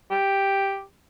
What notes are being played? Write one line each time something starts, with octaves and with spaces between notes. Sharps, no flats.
G4